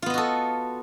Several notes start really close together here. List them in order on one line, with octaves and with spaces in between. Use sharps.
F4 B3 D#5 F#4 A4